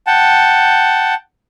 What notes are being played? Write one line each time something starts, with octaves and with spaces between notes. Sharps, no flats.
F#5 G5 A5